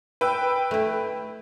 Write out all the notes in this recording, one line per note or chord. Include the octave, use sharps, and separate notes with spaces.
B4 G5 E6
A3 E4